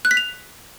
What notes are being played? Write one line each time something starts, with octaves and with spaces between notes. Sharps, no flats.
F#6
B6
F7